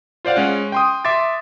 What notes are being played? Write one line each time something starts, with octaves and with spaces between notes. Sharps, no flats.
F4 C5 D5 F5 F#5
G#3 C#4 F#6
G5 C6 D#6
E5 C6 D6 A6